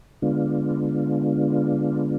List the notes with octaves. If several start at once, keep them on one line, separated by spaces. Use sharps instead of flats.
D3 G#3 B3 D4 F4